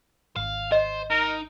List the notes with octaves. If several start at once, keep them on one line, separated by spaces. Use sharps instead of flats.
G#1 F5
C5 D#5
D#4 A#4